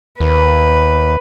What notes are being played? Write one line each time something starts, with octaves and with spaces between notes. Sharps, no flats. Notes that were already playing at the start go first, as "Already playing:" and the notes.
D#2 B4